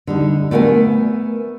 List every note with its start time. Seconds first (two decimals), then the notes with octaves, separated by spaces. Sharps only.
0.07 D3 G3 D#4
0.51 A3 B3 A#4 F#5 G#5